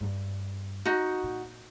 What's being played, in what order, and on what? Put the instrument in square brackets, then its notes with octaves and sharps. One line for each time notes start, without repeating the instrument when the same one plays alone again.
[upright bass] G2
[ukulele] D#4 F#4
[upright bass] A#2